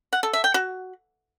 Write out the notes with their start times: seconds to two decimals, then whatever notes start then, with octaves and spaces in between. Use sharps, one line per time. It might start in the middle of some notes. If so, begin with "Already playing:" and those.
0.13 F#5
0.23 A4
0.33 E5
0.44 G5
0.54 F#4